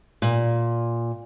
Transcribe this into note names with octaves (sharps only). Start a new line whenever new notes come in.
A#2